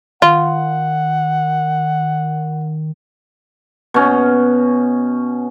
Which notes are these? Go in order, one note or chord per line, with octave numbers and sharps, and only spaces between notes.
D#3 F4 F#5
B2 C#4